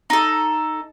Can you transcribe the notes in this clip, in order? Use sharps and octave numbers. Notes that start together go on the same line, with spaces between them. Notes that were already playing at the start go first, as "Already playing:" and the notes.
D#4 A4